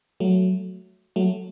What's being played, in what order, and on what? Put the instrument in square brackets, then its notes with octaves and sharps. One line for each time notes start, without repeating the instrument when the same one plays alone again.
[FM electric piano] F#3 A3
F#3 A3